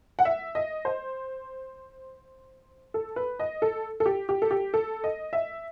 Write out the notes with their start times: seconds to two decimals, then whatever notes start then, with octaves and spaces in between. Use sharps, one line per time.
0.19 F#5
0.25 E5
0.55 D#5
0.85 C5
2.94 A4
3.16 B4
3.40 D#5
3.62 A4
4.00 A4
4.06 G4
4.29 G4
4.42 A4
4.51 G4
4.74 A4
5.04 D#5
5.33 E5